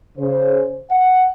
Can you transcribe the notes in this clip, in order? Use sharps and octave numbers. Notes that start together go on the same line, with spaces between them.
C#3 C5
F#5